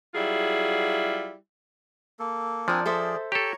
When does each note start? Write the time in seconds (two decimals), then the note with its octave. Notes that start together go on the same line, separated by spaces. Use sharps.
0.14 F#3 G3 E4 F4 G#4
2.19 A#3 A4
2.68 F3 C4 D4 A#4 D5 G#5
2.86 G#4 A4 C5 D5 E5
3.32 G4 A4 C#5 A#5 C#6